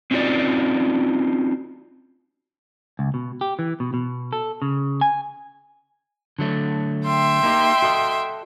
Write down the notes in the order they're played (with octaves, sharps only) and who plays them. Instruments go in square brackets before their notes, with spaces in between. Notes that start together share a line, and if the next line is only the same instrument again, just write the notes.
[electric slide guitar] C4 C#4 D#4 F4 F#4 D5
[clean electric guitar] C#2
B2
G4
E3
B2
B2
A4
C#3
G#5
D3 F#3 A3
[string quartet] E5 G5 C6
[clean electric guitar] A#3 D#4 G4
F#4 A4 D#5